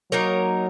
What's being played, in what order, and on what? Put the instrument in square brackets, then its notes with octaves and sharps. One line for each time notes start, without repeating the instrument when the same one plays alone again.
[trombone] F#3 [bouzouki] A#3 D#4 A#4 C#5